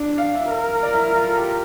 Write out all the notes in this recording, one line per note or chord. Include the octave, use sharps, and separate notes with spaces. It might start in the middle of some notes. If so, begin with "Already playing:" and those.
Already playing: D4
F5
E5
A#4
D5
E4
E4
F4
A4
G4